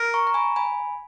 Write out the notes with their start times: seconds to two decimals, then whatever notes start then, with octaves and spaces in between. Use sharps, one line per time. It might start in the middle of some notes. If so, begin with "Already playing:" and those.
Already playing: A#4
0.14 A#5 C#6
0.27 A#5
0.34 G#5 B5
0.56 G#5 B5